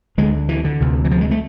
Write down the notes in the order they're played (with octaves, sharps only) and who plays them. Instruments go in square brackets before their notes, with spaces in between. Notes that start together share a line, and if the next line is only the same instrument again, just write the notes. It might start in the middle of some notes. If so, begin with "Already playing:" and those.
[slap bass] D2 D3 G#3
E3
D3
D2 C3
E3
F3
G#3
A3